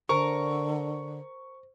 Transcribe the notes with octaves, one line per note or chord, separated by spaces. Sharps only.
D3 A#4 C5 C#6